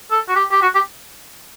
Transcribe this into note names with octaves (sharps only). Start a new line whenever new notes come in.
A4
F#4
G4
G4
F#4
G4